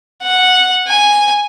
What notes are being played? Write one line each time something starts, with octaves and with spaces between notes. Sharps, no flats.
F#5
G#5